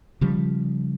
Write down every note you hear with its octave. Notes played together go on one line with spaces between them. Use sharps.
C#3 F3 G3